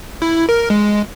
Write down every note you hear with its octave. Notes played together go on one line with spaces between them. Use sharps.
E4
A#4
G#3